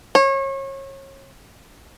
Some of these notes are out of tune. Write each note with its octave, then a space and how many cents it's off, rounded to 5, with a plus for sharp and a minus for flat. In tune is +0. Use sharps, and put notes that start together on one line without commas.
C#5 -30